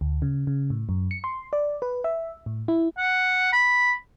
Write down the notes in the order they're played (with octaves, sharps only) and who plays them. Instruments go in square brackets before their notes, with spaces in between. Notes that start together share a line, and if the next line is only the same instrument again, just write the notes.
[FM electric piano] D2
C#3
C#3
A2
F#2
C#7
C6
D5
B4
E5
A2
E4
[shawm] F#5
B5